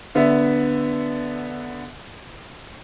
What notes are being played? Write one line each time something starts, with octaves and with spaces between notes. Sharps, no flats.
D3 B3 E5